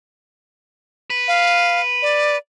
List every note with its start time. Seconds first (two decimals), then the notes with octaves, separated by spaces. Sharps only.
1.10 B4
1.28 F5
2.02 D5